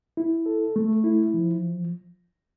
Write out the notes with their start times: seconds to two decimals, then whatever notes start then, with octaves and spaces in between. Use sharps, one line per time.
0.17 E4
0.46 A4
0.76 A3
1.04 E4
1.34 F3